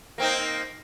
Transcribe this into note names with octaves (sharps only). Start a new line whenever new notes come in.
A#3 C4 D#4